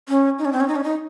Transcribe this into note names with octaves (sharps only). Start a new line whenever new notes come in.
C#4
D#4
C#4
C4
C#4
D#4
C#4
D#4